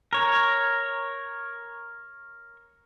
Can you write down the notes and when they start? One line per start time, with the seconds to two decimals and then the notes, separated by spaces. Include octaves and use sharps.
0.13 A#4 C#5